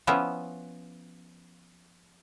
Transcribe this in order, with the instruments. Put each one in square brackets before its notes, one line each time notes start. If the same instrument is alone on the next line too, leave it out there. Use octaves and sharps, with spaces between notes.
[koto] F3 B3 C#4 E4